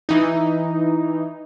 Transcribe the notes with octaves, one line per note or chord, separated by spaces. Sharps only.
E3 D#4